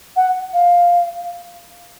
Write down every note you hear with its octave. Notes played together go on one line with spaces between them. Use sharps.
F#5
F5